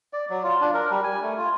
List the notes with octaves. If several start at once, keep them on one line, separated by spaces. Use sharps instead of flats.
D5
F#3
F4
D4
A#4
G3
G#5
A3
F4